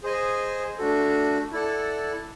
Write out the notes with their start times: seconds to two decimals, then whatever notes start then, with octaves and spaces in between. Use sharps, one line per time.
0.03 G#4 C5 D#5 G#5
0.78 A3 D4 F#4 A4
1.52 E4 A4 D5 F#5 A5